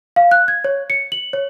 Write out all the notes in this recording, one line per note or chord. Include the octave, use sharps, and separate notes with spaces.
F5
F#6
G#6
C#5
C#7
F#7
C#5